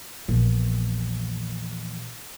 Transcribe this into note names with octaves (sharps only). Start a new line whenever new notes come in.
A#1 E2